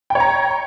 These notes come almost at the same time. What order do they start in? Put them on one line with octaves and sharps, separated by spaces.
G5 C#5 A#5